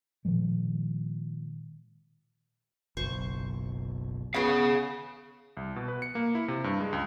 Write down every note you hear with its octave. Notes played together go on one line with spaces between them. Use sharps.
A#2 D#3 F3 G#3
F#1 B1 C5 C#6
B3 C#4 G#4 F5
C2
B2
B4
C#7
A#3
E4
C3
G2
G#3
C#2